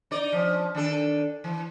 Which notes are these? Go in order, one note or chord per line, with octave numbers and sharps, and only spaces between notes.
D#4 D5
F3 C#4
D#3 D4 A4
E3